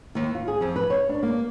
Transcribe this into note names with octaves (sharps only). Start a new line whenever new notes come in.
D#2
F4
G#4
F2
B4
C#5
D4
A#3